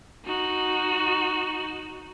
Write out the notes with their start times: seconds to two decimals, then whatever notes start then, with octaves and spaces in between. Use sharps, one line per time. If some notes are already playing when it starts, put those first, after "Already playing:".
0.25 D#4 F#4